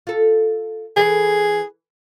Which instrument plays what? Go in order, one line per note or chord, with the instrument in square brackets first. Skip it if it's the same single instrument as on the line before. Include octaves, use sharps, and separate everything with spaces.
[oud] F4 A4
[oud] E3 A4 [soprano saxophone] G#4